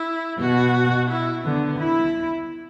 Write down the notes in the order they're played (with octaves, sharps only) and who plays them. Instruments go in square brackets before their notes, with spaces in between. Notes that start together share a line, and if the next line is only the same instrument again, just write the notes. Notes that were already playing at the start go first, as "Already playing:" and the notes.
Already playing: [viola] E4
[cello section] B2 [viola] F#4
[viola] E4
[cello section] D3 [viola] B3
[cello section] E4